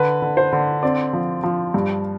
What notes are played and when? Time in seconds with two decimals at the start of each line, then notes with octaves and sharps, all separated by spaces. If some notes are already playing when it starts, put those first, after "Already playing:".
Already playing: D3 B4
0.22 D3
0.37 C5
0.52 D3
0.83 C4 D5
1.13 F3
1.43 F3
1.74 G2